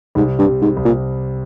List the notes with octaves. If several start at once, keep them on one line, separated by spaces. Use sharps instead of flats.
C2 G#2
G2
C3
G#2
C2
A#2